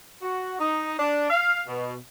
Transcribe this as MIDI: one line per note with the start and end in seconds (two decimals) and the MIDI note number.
0.22 0.56 66
0.59 0.94 63
0.99 1.29 62
1.30 1.61 77
1.68 1.95 47